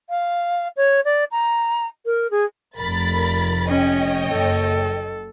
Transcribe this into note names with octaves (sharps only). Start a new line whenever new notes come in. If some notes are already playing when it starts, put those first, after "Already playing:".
F5
C#5
D5
A#5
A#4
G#4
F1 F2 A#4 B5 A6
C#4 C#5 D#5 G5
F#1 A4